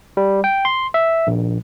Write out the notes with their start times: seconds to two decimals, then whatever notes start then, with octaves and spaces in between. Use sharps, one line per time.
0.17 G3
0.44 G5
0.65 C6
0.94 E5
1.27 A#1